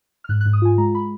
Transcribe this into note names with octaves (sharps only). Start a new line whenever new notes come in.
F6
G#2 F#6
F#6
G#2
D#6
F4 G#5
G#3 A#5
B5